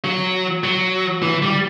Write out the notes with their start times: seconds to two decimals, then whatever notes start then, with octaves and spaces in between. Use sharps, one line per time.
0.04 F#3
0.64 F#3
1.22 E3
1.42 G3